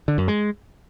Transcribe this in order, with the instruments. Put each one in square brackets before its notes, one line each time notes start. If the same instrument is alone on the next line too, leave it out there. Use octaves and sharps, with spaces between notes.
[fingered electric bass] D3
F#2
G#3